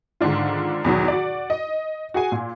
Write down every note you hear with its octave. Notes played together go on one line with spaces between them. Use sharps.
G#2 D3 D#3 D4 F4
E2 B2 D#3 F#3
F#4 D5
D#5
F#4 G#4 G#5
A#2